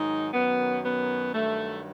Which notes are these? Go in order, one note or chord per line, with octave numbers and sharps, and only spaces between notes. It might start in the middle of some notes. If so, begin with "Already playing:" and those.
Already playing: G#2 D#3 F#3 D#4
F#2 D#3 F#3 B3
B3
G2 D#3 F#3 A3